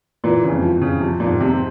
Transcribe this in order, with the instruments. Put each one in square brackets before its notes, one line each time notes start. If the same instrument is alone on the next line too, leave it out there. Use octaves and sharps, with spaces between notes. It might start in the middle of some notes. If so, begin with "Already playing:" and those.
[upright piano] A#2 [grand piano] E3
[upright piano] C#3
[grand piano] F2
[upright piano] F3
[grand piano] F2
[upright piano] C#3
[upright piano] C3 [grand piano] F3
[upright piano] A#2
[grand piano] G#2
[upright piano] C3
[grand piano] C4